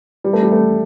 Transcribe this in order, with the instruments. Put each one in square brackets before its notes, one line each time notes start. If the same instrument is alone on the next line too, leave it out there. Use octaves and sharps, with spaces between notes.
[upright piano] G3
A3
G3
A3